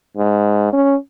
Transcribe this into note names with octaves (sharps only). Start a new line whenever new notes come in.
G#2
C#4